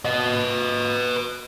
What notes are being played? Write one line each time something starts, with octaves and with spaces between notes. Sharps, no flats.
B4 D#5